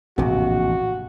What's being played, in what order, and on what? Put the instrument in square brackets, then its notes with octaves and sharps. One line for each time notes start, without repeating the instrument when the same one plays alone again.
[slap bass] A#1 [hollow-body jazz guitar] E2 A2 C3 [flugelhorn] F#4